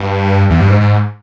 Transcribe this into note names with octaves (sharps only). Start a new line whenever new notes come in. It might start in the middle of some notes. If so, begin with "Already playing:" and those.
Already playing: G2
E2
G2
G#2
G#2